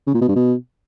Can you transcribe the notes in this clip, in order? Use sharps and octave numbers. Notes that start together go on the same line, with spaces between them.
C#3
A#2
B2
G2
B2